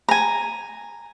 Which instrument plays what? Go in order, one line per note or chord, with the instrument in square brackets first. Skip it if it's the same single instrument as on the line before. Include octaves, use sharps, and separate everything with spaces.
[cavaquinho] G#5 A#5